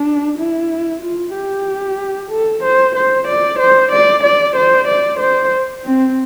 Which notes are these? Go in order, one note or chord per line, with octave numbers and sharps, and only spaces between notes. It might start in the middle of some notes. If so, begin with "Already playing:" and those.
Already playing: D4
E4
F4
G4
A4
C5
C5
D5
C5
D5
D5
C5
D5
C5
C4